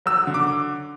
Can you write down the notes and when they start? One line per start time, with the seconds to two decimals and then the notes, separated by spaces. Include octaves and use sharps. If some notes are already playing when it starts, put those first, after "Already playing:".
0.06 F#3 E6
0.27 D3
0.34 D6